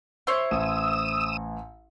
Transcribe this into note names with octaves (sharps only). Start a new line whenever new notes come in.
E4 C5 C#5
A1 D#6 E6